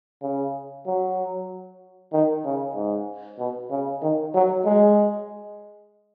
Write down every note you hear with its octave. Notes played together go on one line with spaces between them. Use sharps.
C#3
F#3
D#3
C#3
G#2
B2
C#3
D#3
F#3
G#3